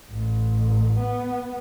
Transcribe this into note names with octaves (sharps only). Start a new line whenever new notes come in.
A1
B3